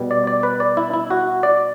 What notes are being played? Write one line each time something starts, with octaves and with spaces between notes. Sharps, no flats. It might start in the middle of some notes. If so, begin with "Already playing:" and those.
Already playing: B2 G3
D5
D5
B4
D5
E4
E4
F#4
D5